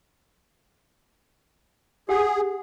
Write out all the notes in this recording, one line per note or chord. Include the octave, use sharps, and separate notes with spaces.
G4 G#4 F#5 D#6